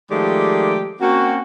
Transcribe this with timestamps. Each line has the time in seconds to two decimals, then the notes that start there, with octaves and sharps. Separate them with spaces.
0.11 D#3 F3 G#3 A3 G4 D5
1.01 A#3 C4 C#4 F#4